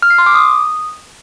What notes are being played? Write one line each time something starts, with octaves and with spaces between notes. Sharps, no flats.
F6
C7
C6
D6
D#6